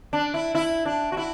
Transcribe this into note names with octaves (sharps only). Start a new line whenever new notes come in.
D4
E4
E4
D4
F#4
E4